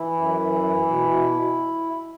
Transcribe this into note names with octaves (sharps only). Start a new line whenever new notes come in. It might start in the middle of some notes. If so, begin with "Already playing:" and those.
Already playing: E3 E4
F#2
E3
E3
B2
B2